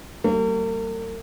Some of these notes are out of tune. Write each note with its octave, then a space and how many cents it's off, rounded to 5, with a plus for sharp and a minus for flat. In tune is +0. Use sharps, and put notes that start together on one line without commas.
G3 -40 A#3 -45